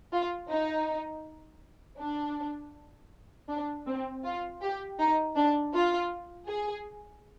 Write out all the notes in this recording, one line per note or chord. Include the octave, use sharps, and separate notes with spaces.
F4
D#4
D4
D4
C4
F4
G4
D#4
D4
F4
G#4